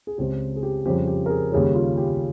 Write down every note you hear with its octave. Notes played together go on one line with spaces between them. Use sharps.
G#4
C#2 C#3 G#3 C4 G4
G#4
G4
F2 C#3 G3 C4 G4
G4
A#4
G#4
D#2 C#3 G3 C#4 G#4
F4
G4